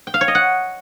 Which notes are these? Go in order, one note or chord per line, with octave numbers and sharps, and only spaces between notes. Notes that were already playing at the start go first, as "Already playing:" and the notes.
G5
F5
C#5
D#5
F#5